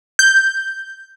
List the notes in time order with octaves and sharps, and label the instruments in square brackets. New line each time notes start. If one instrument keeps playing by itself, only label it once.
[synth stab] G6